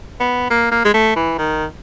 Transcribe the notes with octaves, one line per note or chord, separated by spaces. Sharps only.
B3
A#3
A#3
G#3
A3
E3
D#3